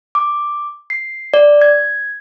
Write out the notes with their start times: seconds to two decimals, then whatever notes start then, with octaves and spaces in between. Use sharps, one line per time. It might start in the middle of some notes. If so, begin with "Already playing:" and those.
0.15 D6
0.90 C7
1.34 D5
1.62 G#6